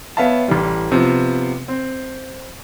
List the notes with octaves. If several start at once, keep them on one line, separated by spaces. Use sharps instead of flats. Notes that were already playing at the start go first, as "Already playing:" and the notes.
B3 C#5 E5 F5 A5
A1 E3 G3
C3 F3 B3
C4